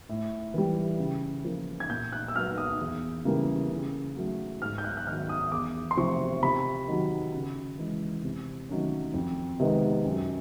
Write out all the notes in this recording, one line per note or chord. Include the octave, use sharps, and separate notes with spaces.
A2
E3 G3
C#3
F3 A#3
G#6
A#2 G6
F#6
E6
F#3 B3 F6
D#6
E2
C#3 E3 G3 A#3
C#3
F#3 A3
G#2 F6
G6
F#6
F#6
D#3 F#3 F6
D#6
E2 D6
C6
C3 F3 A3 C4 C#6
C3 B5
D#3 F#3
C#3
E3 G#3
C3
D#3 F#3 A3 C#4
F2
C3 D#3 G#3 B3
F#2